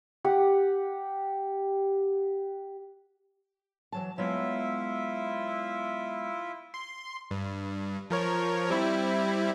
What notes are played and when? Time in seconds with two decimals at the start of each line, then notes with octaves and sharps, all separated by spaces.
0.24 G4 F#5
3.92 E3 F#3 A5
4.18 F#3 G#3 B3 E4 F4 E5
6.74 C6
7.31 G2
8.10 F3 A#4 C#5
8.70 G3 C4 E4